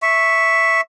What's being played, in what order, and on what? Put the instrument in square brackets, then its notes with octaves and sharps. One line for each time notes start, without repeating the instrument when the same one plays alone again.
[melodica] E5 C#6